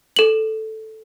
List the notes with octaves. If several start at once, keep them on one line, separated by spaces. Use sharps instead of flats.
A4 F#7